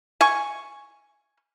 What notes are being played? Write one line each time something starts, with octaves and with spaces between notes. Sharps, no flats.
G#5 C#6